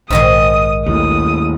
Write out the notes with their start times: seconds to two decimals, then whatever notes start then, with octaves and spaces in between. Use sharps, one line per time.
0.10 A#1 G#2 D#3 G#3 D#6
0.86 D#2 A2 D#6